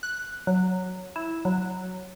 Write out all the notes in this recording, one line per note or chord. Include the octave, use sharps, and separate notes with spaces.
F#6
F#3
E4
F#3